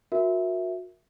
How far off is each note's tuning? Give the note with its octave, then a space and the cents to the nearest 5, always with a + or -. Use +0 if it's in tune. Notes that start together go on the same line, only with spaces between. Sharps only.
F#4 -30 A#4 +10 E5 +0